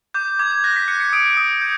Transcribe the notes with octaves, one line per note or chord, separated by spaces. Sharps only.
D6 G6
D6 G#6
G#6
F#6 A#6
B6
F#6 C#7
C#7
D#6 D7
D#6
G6